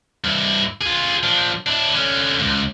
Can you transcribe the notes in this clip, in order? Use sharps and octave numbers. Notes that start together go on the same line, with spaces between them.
G2 E4
F4 G#4
F3 D4
D4 E4
D3 C#4
C#2 G#2